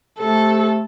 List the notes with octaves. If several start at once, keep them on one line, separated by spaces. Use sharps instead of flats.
C3 A3 A4